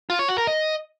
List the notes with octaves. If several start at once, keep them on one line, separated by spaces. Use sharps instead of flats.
F4
C#5
F#4
A#4
D#5